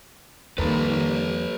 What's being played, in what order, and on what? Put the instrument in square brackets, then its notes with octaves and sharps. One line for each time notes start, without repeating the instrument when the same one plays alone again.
[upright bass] F2 [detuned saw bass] D#3 [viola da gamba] G3 A#3 [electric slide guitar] A4 B4